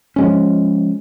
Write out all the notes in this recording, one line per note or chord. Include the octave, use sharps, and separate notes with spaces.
F3 G#3 C#4